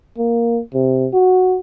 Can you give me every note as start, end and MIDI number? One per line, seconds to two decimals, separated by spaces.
0.18 0.61 58
0.74 1.08 48
1.13 1.59 66